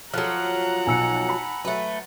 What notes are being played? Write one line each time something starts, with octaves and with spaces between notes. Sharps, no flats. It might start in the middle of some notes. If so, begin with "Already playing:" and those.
F3 F#3 A4 F#5 A#5 F6 F#6
B1 B2 G#5 E6 C#7
A5 B5
F#3 A3 B4